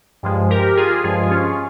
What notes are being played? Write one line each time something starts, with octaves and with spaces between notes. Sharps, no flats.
G2 F3 G#3
G4 A#4
F4 G#4
G2 F3 G#3 F4 G#4
C#4 F4